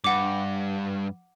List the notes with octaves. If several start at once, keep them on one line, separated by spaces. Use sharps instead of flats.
G2 F#5 D6